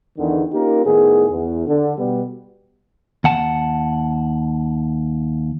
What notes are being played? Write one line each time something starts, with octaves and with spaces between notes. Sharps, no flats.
E2 D3 D#3
A#3 C#4 D#4 F4 G4 A#4
A2 D#3 B3 G#4
E2
D3
B2 G3 B3
D#2 F#5 A5